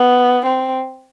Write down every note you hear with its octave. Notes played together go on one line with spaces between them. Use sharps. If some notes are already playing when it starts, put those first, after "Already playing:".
Already playing: B3
C4